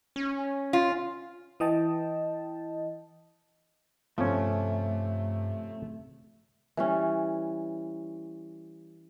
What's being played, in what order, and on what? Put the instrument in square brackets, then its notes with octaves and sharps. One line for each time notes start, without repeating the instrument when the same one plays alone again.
[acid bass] C#4
[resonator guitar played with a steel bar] F4
[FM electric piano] E3 D#5 G5 A5
[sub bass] G2 [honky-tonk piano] C3 [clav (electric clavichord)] F3 C#4 [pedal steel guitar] A3
[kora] E3 G3 C#4